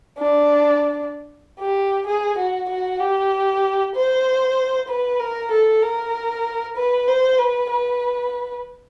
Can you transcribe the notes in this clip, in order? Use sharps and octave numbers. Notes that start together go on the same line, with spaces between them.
D4
G4
G#4
F#4
F#4
G4
C5
B4
A#4
A4
A#4
B4
C5
B4
B4